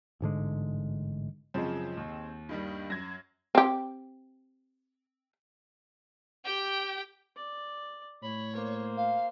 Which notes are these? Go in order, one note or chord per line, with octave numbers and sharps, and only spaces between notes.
A1 G#2 D3 G#3
F#2 C#3 F3 G#3 C4
D#2
G2 D#3 G3
F#2 G#6 A#6
C4 G4
G4 G5
D5
A2 C#5 B5
A#3 C5
F5